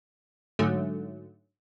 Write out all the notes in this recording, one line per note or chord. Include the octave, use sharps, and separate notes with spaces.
G#2 D3 F#3 A3